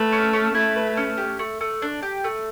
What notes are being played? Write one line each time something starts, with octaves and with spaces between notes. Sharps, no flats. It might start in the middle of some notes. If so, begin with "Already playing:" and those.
Already playing: A3 B4
C#4
C#4
A3 E4
B4
C#4
G4
A3
A3
D4
G4
A3